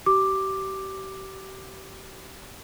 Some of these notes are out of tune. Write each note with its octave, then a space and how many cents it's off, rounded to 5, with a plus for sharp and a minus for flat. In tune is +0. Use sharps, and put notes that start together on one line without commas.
G4 -35 D6 +5